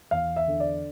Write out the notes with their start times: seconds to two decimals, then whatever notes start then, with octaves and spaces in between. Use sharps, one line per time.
0.11 E2 F5
0.36 E5
0.48 D3
0.60 D5